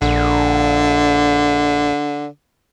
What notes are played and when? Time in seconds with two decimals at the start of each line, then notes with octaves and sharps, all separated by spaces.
0.02 A#1 D3